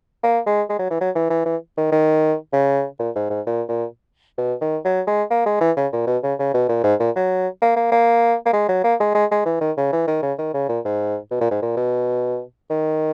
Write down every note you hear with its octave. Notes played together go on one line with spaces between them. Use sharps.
A#3
G#3
G#3
F#3
E3
F#3
E3
E3
E3
D#3
D#3
C#3
A#2
G#2
G#2
A#2
A#2
B2
D#3
F#3
G#3
A#3
G#3
E3
C#3
A#2
B2
C#3
C#3
B2
A#2
G#2
A#2
F#3
A#3
A#3
A#3
A#3
G#3
F#3
A#3
G#3
G#3
G#3
E3
D#3
C#3
E3
D#3
C#3
D#3
C#3
A#2
G#2
B2
A#2
G#2
A#2
B2
D#3